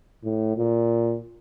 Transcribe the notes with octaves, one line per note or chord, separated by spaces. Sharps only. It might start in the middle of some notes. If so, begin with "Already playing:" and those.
A2
A#2